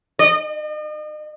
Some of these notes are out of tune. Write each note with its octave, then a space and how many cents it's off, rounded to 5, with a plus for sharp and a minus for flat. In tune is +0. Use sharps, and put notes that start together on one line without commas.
D#5 -40